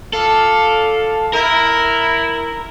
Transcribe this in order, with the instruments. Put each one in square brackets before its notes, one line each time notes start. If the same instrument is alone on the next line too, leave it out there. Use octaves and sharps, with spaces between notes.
[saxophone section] F4 D5 F5 [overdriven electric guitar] A4
[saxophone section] E4 [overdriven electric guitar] A#4